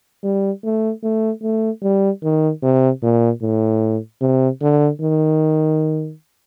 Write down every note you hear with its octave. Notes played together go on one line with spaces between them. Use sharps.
G3
A3
A3
A3
G3
D#3
C3
A#2
A2
C3
D3
D#3